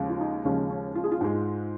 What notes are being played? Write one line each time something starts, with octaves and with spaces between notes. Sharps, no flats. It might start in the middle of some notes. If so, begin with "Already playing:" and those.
Already playing: D#2 C#3 F3 G#3
F4
D#4
D#2 C#3 F3 G#3 C#4
C#4
F4
G#4
F4
G#2 G#3